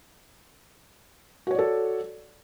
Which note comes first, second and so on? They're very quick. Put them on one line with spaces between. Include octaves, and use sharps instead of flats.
F#4 C#5 D5 A4